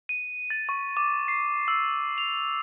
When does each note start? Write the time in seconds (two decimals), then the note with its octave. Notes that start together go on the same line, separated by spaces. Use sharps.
0.09 D#7
0.50 A6
0.69 C#6
0.97 D6
1.28 C7
1.68 E6
2.18 F7